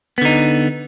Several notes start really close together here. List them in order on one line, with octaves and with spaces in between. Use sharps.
B3 D3 D#4